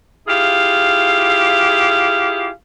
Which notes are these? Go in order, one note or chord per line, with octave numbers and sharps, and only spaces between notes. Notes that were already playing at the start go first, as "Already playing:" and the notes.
E4 F4 G4 G#4 F5